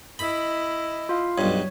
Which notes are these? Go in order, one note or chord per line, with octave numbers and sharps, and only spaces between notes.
E4 D#5 B5
F4 F5
B1 G2 C#5